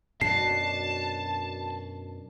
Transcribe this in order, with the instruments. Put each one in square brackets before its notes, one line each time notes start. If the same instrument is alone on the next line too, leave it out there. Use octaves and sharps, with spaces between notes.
[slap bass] F#2 B2 [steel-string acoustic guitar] D4 F#4 [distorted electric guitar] A5 [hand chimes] C7